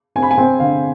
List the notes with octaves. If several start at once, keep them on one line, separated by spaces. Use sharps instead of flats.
C4 G#5
B5
G#5
C4 G5
D3 F5